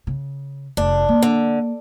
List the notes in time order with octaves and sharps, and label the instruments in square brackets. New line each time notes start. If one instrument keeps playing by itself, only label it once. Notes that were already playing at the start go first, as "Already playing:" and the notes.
[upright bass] C#3
[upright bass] F1 [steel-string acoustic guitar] D4
[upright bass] A#3
[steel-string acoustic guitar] D3